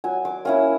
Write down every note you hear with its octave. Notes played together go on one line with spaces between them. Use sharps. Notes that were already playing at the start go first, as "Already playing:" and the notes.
F#3 G#5
D6
A#3 C#4 E4 D#6